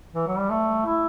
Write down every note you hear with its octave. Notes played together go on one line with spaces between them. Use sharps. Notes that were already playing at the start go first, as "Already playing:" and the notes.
E3
F#3
G3
A3
E4